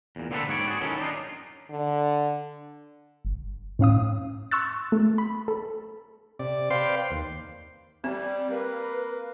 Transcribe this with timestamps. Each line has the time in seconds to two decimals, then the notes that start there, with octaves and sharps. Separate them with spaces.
0.16 E2 A#2
0.31 D3 A#3 C4 F#4 A4 B4
0.48 G#2 B3 C#5 D5
0.67 F#4 G#4
0.81 D#3 F#3 C#4 E4 A4
0.99 D4 D#4 F4
1.70 D3
3.25 G1
3.79 A2 C#4 F5 D#6
4.51 C6 C#6 E6 F#6 A6
4.92 A3
5.18 B5
5.48 A4
6.39 C3 D5
6.71 B4 C5 D5 F5 G5 C6
7.11 D#2
8.04 G3 C4
8.50 A#3 B4